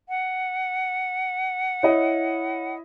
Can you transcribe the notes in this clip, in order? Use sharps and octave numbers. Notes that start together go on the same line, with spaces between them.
F#5
E4 C#5 D#5